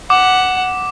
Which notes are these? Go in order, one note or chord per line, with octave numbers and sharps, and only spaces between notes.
F#5 D6